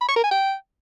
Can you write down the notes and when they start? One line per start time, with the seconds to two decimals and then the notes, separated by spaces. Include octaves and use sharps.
0.01 B5
0.08 C#6
0.16 A#4
0.24 G#5
0.31 G5